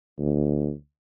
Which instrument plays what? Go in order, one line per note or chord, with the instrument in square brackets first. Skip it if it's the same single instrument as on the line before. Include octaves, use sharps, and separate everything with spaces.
[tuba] D2